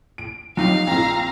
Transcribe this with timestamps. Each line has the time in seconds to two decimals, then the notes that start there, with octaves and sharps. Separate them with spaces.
0.18 D7
0.57 F2 F#3 D#4 G4 F5
0.87 A#1 C4 A#5